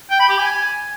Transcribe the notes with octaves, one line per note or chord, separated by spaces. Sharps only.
G5
B5
G4
G#5